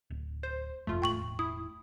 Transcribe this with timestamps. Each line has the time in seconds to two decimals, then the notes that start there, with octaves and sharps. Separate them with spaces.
0.10 D1
0.43 C5
0.87 F#1 F2 A3 F4
1.02 E1 A2 G5 C#6 F#7
1.39 E4 D#6